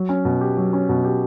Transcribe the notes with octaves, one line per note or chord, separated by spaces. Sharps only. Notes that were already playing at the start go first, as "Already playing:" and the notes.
Already playing: F#3
C#4
B2
G4
F#3
C#4
B2
G4